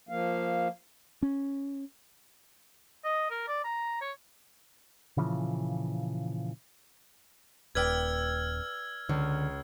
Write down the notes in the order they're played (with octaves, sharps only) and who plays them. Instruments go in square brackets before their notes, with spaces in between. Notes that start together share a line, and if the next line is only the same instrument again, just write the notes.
[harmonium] F3 A#3 F5
[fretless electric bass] C#4
[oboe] D#5
A#4
D5
A#5
C#5
[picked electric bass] A#2 C#3 E3 F3
[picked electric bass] D#1 [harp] B4 D5 G5 [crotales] E6 F6 G#6
[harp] C#2 [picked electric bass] D3